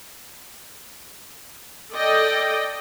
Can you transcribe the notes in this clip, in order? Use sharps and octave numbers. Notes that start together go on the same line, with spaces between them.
A4 D5 D#5 G5